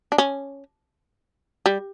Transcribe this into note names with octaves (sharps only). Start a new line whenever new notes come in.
D4
C#4
G3